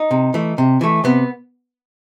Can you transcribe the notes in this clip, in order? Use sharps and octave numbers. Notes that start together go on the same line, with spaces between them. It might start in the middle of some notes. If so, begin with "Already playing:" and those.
Already playing: D#4
C3
E3 A3
C3
E3 A3
C3 B3